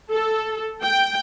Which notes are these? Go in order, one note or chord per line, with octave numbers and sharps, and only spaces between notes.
A4
G5